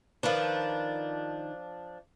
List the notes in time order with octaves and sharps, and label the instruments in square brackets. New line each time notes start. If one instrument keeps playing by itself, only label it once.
[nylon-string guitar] D#3 B4 [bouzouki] F3 D4